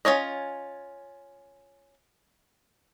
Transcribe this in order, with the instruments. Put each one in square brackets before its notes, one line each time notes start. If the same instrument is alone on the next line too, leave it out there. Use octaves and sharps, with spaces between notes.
[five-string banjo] C#4 F4 C#5 D#5